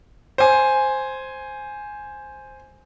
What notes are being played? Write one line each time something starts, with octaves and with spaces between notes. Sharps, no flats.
C5 G#5